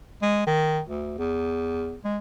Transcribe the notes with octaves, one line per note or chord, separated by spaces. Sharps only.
G#3
D#3
D2
E2
G#3